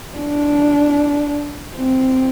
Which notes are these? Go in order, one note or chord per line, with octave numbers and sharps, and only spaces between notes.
D4
C4